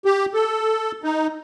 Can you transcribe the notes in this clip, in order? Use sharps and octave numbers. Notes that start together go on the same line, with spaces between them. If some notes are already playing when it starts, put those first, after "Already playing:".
G4
A4
D#4